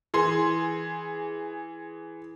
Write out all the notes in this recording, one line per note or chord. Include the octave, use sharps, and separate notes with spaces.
E3 G#4 C6